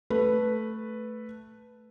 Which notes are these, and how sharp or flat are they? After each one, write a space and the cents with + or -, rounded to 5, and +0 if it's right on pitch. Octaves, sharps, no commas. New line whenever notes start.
A3 +0 B4 +0